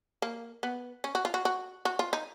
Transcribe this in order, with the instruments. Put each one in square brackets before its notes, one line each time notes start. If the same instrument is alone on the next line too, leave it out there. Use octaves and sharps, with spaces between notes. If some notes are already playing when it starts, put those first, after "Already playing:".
[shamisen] A#3
B3
C#4
F#4
F4
F#4
F#4
F#4
F4
D#4